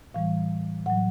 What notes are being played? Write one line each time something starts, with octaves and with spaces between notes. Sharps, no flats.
A2 E3 G3 F5
A2 F#3 F#5